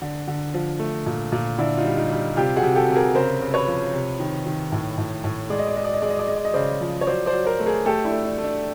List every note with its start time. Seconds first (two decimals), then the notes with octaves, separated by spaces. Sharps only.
0.02 D3
0.28 D3
0.54 F3
0.79 A3
1.06 A#2
1.32 A#2
1.58 D3 D4 E4
1.77 D#4 F4
1.85 G3
1.97 D#4 F4
2.11 G3
2.37 C3 F4 G4
2.56 F#4 G#4
2.63 C3
2.75 G4 A4
2.89 C3
2.96 G#4 A#4
3.15 C#3 A#4 C5
3.41 C#3
3.54 B4 C#5
3.67 F3
3.93 C3
4.20 D#3
4.46 D#3
4.72 A2
4.98 A2
5.24 A2
5.50 G#3 D5
5.59 D#5
5.67 D5
5.76 G#3 D#5
5.85 D5
5.94 D#5
6.02 G#3 D5
6.10 D#5
6.19 D5
6.28 G#3 D#5
6.37 D5
6.45 D#5
6.54 C#3 C5 D5
6.81 F3
7.01 C#5
7.07 F#3 C5 D5
7.26 C5 D5
7.33 F#3
7.46 A#4 C5
7.60 A3
7.66 G#4 A#4
7.86 A3 G4 A4
8.04 D4 E4
8.12 A3
8.25 D4
8.38 A3
8.44 D4